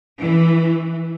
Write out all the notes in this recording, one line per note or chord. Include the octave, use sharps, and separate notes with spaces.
E3